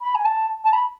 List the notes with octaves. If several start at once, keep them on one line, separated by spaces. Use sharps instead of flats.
B5
G#5
A5
A5
B5